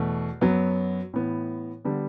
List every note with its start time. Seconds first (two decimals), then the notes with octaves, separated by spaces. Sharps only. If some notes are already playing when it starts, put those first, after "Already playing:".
Already playing: E2 B2 A3
0.41 F#2 F#3 B3
1.14 A2 E3 B3
1.85 D3 G3 B3